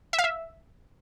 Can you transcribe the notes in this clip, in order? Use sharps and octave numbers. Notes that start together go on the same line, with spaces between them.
E5
F5
E5